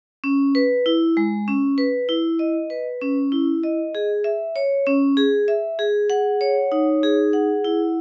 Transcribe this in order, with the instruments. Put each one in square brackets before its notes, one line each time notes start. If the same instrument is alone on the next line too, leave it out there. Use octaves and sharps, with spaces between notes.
[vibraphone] C#4
B4
E4
G#3
C#4
B4
E4
D#5
B4
C#4
E4
D#5
G#4
E5
C#5
C#4
G#4
E5
G#4
F#5
C#5
D#4
G#4
F#5
E4